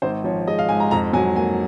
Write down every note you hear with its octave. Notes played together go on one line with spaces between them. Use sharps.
G#1 C5
F3 C#5
G#3 D#5
F5
G#2 G#5
A#5
F2 A#5
F#3 G#5
A#3 G#5